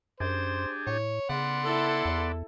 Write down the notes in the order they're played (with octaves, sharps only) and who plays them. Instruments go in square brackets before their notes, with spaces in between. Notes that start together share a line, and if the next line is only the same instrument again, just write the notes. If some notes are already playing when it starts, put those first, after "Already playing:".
[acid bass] F#2 [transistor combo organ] D4 G4 G#4 [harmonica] C5
[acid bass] A2 [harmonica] C#5
[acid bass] C#3 [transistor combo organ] B3 D5 [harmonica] F#5 C6
[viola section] E4 A4
[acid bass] E2